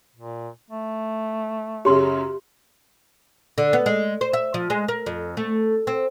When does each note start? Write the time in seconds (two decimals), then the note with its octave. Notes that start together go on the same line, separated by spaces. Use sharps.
0.16 A#2
0.70 A3
1.85 F#2 C#3 C#4 G4 C6
3.58 D3
3.73 B3
3.86 G#3
4.21 C5
4.33 E5
4.54 F3
4.70 G#3
4.88 A#4
5.06 F2
5.37 A3
5.87 C4